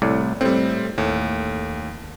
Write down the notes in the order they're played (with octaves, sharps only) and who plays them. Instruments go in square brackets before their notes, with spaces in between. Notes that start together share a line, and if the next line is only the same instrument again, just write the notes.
[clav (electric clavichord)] C2 A2 D5
[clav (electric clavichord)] A2 [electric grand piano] G3 C4
[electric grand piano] D#2 [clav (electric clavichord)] A2